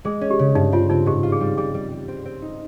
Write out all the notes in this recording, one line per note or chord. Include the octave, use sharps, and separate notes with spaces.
G#3 G#4
C#4
G4
C#3
G2 D#4
C4 F4
C4 D#4
G#2 G4
F4
G#4
G3
G3 G#4
G3
G3
C4
C4
D#4